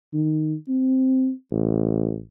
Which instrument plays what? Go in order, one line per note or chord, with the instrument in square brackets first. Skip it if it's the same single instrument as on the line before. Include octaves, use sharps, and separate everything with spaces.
[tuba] D#3
C4
A1